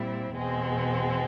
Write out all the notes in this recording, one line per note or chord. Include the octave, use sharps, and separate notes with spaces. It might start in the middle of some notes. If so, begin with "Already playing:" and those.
Already playing: A#2 G3 C4 E4
E2 B2 G#3 C4